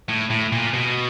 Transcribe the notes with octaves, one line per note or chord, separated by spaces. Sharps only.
A2
A2
A#2
B2